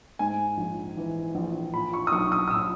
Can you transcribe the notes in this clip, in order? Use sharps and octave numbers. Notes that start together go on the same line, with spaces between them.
G#2 G#5
A#1
E3
A#1
A#2 B5
C#6
D#6
B1 C#6
D#6
D#6
A#2 E6